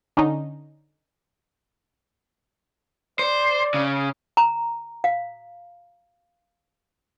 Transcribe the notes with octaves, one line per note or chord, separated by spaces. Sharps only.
D3 C#4 D#4
C5 D5
C#3
A#5
F5